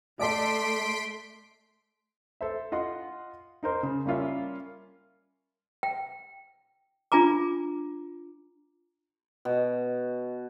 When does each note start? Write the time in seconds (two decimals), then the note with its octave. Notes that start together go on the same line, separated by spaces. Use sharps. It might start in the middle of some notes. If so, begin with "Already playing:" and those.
0.19 A3 A4 D5 D#5 C6 B6 D7
2.41 A4 C5 E5
2.72 F4 D#5 F#5 C6
3.63 D#4 A#4 C5 C6
3.83 C#3
4.06 G3 A#3 C#4 F4 E5
5.83 G5
7.12 D4 F4 G#5 A#5 D6
9.45 B2